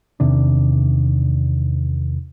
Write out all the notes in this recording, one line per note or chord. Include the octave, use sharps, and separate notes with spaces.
E2 C3 D#3 D4